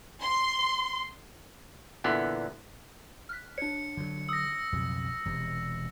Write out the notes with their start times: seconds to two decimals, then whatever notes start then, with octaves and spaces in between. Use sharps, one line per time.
0.22 C6
2.04 A#2 D3 E3 B3
3.29 F6 F#6 B6
3.58 D4 C#5 C#7
3.97 D3 E3 F#3
4.29 D#6 E6 A#6
4.72 B1 F2 C#3
5.25 E1 C3